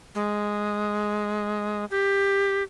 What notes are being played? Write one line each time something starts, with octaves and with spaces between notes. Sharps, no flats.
G#3
G4